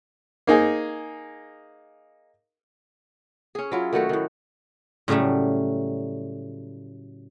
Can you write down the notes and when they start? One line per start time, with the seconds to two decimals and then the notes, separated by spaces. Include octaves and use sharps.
0.47 A#3 D#4 G#4
3.55 C#4 G#4
3.72 F#3 E4 F4
3.93 D#3 F#3 A3 F#4
4.09 A2 D#3
5.08 A2 C#3 F#3 G3 A3